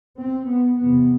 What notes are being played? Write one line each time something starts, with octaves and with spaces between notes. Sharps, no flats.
C4
B3
E2 C3 B3